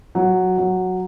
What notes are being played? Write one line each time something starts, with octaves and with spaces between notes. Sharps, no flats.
F#3
F#3